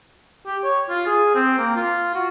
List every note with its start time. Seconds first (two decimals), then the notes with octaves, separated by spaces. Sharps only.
0.46 G4
0.63 C#5
0.89 F4
1.06 G#4
1.35 C4
1.58 A#3
1.76 F4
2.14 F#4